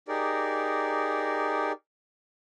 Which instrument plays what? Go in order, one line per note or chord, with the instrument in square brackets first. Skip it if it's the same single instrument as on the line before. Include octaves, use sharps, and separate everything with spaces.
[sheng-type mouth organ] D#4 G4 G#4 A#4 D5